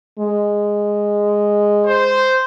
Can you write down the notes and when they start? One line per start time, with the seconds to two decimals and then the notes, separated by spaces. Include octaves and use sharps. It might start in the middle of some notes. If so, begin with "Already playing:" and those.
0.19 G#3
1.87 C5